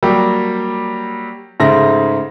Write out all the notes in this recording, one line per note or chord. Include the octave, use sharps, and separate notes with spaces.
F#3 G3 A#3 G4
G#2 C#3 A3 E5 A#6